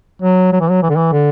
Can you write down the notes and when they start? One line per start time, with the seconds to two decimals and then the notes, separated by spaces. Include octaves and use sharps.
0.22 F#3
0.53 F#3
0.61 E3
0.70 F#3
0.83 E3
0.90 D3
0.97 E3
1.12 D3